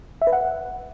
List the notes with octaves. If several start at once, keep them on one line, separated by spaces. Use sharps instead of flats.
E5
B4
F#5